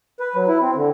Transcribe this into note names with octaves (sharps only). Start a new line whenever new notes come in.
B4
F#3
E4
C4
D3